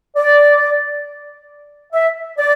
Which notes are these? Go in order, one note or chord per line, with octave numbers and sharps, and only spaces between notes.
D5
E5
D5